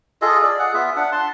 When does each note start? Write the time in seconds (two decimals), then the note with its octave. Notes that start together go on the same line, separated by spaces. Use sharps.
0.22 F4 G#4 A4 D#5
0.43 D5
0.59 G#4 F#5
0.74 B3 F4 E5
0.96 D4 F#5
1.12 A5 C6